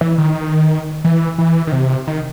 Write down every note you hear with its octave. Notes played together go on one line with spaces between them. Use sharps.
E3
D#3
E3
E3
D#3
C3
D#3